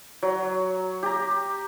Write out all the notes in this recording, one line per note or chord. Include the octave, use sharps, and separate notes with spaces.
F#3
G4 A#5